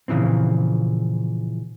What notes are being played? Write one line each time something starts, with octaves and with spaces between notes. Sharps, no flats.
A#2 C#3 E3 F3 C4